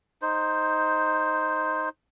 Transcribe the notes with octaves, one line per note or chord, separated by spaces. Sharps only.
D#4 C5